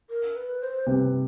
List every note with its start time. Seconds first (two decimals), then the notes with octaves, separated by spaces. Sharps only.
0.10 A#4
0.36 B4
0.61 C5
0.87 C2 C3 B4